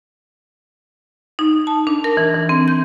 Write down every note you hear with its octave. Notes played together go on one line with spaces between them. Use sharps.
D#4
A5
D4
A#4
E3
E3
C4
G6